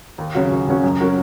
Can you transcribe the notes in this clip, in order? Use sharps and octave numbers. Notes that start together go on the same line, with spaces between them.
D#2
C#3 F#3 C#4 F#4
D#2
C#3 F#3 C#4 F#4
F#2
F#3 C#4 F#4 A#4